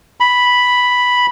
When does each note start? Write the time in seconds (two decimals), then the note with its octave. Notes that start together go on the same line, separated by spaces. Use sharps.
0.20 B5